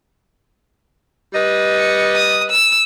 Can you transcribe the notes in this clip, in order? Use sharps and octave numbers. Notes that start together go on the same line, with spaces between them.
G3 B4 D#5
C#7
D#6
E6